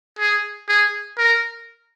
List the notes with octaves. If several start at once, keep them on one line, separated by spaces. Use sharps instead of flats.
G#4
G#4
A#4